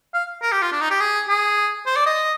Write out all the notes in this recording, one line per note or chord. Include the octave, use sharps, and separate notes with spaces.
F5
A#4
G4
F4
D4
D#4
G4
G#4
G#4
C5
D5
D#5